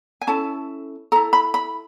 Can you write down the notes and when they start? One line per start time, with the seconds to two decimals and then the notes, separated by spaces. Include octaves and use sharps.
0.21 G#5
0.27 C#4 E4 A4 A5
1.12 A4 A#5
1.16 E4
1.33 B5
1.54 B5